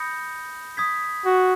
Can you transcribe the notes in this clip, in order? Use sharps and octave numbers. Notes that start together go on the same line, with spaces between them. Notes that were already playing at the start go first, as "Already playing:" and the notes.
Already playing: B5 D#6 G6 A#6 C#7
D#6 G#6 B6
F#4